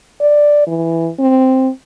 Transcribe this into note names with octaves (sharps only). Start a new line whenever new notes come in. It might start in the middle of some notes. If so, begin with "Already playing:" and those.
D5
E3
C4